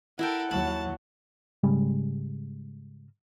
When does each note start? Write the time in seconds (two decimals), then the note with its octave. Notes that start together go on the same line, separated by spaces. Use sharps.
0.19 E4 A4 A#4 E5 F#5 G5
0.51 D#2 F#3 A5 B5
1.63 G#2 C#3 G3 G#3